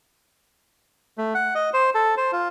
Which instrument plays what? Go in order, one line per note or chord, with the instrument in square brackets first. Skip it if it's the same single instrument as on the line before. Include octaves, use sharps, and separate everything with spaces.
[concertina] A3
F#5
D#5
C5
A4
C5
F4